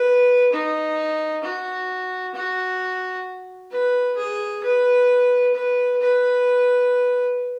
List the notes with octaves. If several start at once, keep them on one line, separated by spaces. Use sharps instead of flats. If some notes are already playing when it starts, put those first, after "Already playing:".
Already playing: B4
D#4
F#4
F#4
B4
G#4
B4
B4
B4